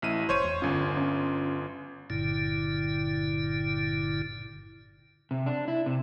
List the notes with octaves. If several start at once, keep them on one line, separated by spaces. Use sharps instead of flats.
A1 E4 D#7
F1 C5 C#5 D#7
E2
G1 C#4 F4
C#4
G1 G2 A#2 D3 E4
C3
D4
E4
C3